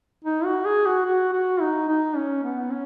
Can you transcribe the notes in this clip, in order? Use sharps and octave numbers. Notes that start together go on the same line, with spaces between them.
D#4
F#4
G#4
F#4
F#4
F#4
D#4
D#4
C#4
B3
C#4